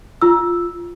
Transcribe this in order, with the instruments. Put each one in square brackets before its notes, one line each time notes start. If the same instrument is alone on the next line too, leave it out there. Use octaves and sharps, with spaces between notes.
[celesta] F4 E6